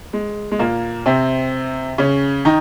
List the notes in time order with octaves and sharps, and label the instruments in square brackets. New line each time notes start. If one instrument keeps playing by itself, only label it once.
[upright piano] G#3
G#3
A#2 A#3
C3 C4
C#3 C#4
D#3 D#4